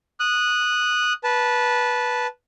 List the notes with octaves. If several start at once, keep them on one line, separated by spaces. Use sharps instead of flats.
D#6 F#6
B4 A5